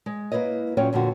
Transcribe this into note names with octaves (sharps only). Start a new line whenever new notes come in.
G#3
A#3 E4 B4 C#5 D#5
A#2 F#3 C#4 C#5 G5
F2 A#2 D3 F#4